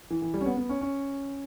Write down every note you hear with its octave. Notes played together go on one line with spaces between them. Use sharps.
E3
E3
G3
C#4
B3
B3
C#4
C#4